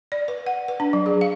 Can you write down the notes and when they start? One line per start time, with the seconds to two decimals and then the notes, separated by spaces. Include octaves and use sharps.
0.12 D5
0.28 B4
0.46 F#5
0.68 B4
0.80 D4
0.93 F#3
1.06 G#4
1.21 F5